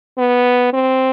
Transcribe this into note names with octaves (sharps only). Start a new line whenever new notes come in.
B3
C4